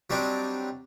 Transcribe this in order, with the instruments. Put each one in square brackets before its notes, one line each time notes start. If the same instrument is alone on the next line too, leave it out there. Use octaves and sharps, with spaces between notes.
[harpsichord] F#3 G3 C4 D4 D#4